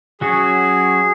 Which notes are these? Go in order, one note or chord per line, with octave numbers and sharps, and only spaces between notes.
F#3 C#4 F#4 G#4